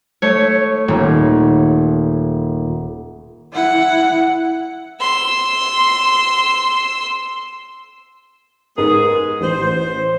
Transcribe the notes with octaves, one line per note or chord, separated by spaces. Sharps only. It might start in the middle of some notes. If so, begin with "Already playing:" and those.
A3 C#5
D#1
E4 F#5
C6 E6
G#2 G#3 B3 G#4 A#4
A1 C5